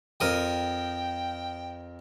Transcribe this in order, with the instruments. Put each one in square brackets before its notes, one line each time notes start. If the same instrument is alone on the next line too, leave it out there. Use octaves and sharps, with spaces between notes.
[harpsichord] F2 A#4 D#6 [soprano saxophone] G5